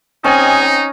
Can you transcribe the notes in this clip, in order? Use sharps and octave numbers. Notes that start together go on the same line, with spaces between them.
G3 C4 C#4 D#4 D#5 G#5